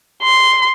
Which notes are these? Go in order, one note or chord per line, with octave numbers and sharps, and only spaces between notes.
C6